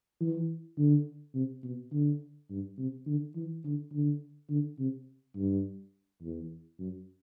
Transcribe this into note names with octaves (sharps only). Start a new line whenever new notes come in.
E3
D3
C3
B2
D3
G2
C3
D3
E3
D3
D3
D3
C3
G2
E2
F#2